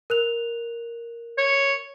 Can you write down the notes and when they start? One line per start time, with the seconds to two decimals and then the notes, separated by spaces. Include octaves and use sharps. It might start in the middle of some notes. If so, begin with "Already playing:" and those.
0.10 A#4 F#6 F7
1.38 C#5